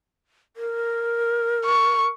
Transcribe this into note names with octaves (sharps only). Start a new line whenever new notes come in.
A#4
C#6